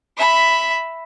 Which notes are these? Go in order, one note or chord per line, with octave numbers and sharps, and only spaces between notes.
E5 B5